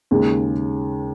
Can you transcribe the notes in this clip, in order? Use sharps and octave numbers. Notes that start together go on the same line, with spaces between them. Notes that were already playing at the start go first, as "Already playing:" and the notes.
D#2 C#3 G#3